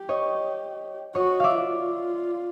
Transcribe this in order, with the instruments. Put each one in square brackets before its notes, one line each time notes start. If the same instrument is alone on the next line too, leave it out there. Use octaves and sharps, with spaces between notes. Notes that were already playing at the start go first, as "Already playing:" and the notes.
Already playing: [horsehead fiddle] G4
[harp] C#5 D#5
[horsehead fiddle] F#4 [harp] C#5 D#5
[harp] D5 E5 F5
[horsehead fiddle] F4